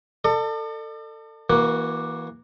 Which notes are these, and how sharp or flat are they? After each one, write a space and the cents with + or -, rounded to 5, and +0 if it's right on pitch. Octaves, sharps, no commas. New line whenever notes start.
A4 +25 D5 +45
E3 -10 A#3 +20 F#4 +0